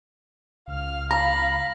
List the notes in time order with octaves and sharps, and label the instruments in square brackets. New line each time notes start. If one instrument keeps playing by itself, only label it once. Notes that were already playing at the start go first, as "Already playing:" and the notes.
[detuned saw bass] C#2 [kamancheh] F5 F6
[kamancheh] F5 B5 [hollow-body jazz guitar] A#5 [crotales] A#6